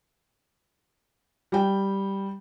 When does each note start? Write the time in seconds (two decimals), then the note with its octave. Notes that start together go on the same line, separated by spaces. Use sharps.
1.52 G3 G5